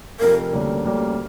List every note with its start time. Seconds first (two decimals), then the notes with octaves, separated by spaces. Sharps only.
0.20 F1 F2 C3 A#4
0.52 D2 D3 G3 A#3 C#4
0.84 D2 D3 G3 A#3 C#4